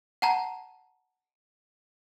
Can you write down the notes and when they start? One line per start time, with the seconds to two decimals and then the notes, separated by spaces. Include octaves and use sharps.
0.22 F#5 A5 A#5